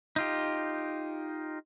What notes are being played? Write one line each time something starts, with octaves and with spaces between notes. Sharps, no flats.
D#4 F4 G4